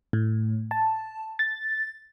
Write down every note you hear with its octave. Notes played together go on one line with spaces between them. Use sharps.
A2
A5
A6